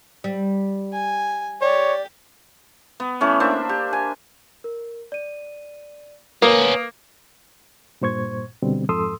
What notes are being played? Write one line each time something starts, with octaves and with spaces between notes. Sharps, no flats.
G3
G#5
G4 C#5 D5
B3
E3 A3 C#4
A#3 D4 C5 E5
G4
G#5
A#4
D5 D#7
A#3 B3 C#4 A#4 B4 D#6
G2 A#2 C5 C#6 G#6
B2 D3 G3 C4
F2 G#2 A4 C6 D#6 E6